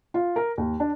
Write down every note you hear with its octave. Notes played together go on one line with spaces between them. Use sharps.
F4
A#4
D#2
D4